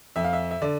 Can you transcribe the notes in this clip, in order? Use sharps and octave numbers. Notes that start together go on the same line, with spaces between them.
F2 E5
F5
E5
E5
D3 D5